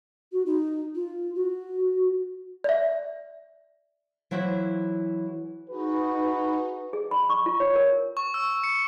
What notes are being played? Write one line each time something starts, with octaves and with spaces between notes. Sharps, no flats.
F#4
D#4
F4
F#4
D5 E5
E3 F#3 E4 F4 C5 C#5
D#4 F#4 G#4 B4
G#4
B5
C#6
F4
C#5
A#4
C#6
E6
C#7